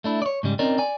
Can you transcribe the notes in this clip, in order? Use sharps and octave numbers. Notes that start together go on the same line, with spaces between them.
A3 D4 E4
C#5 D5
G#2 C#3 G3
C4 C#4 D#4 A#4 D5
D5 G#5